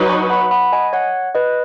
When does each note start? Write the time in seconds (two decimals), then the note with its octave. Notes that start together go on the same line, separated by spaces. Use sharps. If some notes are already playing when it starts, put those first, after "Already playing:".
Already playing: F#3 D#4 B4
0.09 G#5 C#6
0.30 F#5 B5
0.51 F#5 B5
0.72 D#5 G#5
0.93 C#5 F#5
1.35 B4 D#5